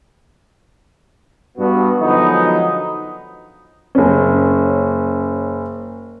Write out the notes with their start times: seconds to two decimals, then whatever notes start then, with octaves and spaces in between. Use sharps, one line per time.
1.57 G2 B3 F#4
2.00 D3 F3 F#3 G#3 B3 D#4
3.95 F#1 C#4